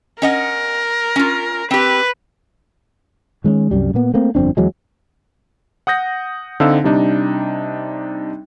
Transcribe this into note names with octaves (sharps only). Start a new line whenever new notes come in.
C#4 A#4 D#5 F#5
C#4 F4
C4 G4 B4
D#3 G#3 A3 C#4
C2 F#2 G3
A#2 A#3 B3
A3 A#3 C4
G1 F2 C4 D4
E2 E3 F#3 G#3
F#5 D#6 G6 A#6
D3 C4 D#4 A4 F5 E6
C3 G3 D4 D#4